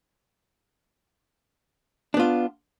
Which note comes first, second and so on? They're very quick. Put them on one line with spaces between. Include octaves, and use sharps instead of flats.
D4 B3 F4